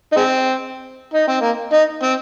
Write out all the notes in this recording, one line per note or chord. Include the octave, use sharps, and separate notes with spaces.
D#4
G#3 C4
D#4
C4
A#3
D#4
C4